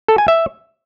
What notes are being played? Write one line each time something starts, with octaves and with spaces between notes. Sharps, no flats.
A4
G#5
E5